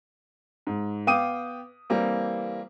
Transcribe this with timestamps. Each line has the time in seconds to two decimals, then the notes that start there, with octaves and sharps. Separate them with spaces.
0.67 G#2
1.07 B3 F5 G5 D6 D#6 D#7
1.90 E3 G3 A#3 C4